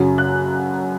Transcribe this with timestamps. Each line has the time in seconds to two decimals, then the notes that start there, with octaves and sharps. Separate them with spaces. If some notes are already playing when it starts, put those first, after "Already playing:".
Already playing: F#2 C#3 F#3
0.18 F#6